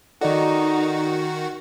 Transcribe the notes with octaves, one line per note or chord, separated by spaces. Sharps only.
D#3 D#4 F#4 A4 D5 D#5